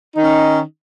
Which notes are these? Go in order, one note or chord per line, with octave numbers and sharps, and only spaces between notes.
D#3 C#4 D#4